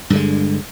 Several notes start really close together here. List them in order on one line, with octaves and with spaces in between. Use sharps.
G2 D3 G#3